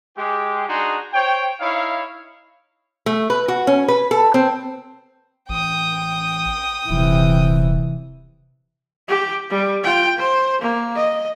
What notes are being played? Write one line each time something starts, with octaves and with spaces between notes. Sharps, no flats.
G#3 G4
D4 D#4 F#4 G#4 C6
C5 C#5 G5
D#4 E4 C#5 F5
A3
B4
F#4
C#4
B4
A4
C4
A1 G5 D#6
D#1 C3 E3
G4
G3
F4 G5
C5
A#3
D#5